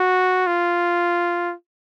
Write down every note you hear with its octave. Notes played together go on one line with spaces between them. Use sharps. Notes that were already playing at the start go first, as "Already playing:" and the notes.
Already playing: F#4
F4